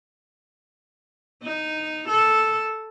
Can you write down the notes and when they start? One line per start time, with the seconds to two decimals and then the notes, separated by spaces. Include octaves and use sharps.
1.43 D#4
2.09 A4